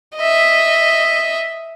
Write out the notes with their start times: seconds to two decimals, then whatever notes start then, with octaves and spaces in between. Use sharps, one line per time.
0.16 D#5 E5